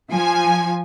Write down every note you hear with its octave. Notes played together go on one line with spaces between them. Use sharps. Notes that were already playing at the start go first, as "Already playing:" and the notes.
F3 G#5